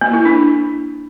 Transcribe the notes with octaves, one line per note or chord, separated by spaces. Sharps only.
A#3
E4
D4